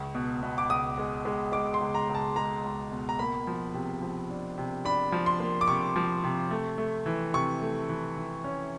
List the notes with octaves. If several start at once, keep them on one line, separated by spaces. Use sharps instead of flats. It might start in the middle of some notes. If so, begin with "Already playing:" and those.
Already playing: C#2
B2
B2
D6
C#2 D#6
G#3
G#3
G#3 D6
C6
C#2
A#5
C#2
A5
G#3 A#5
C#2
B2
A#5
A#3 B5
F3
C3
F3
D4
C3
D4 B5
F3
C6
A#3
D6
C3 C#6
F3
C3
A3
A3
E3
C3 C#6
A3
E3
E3
C#4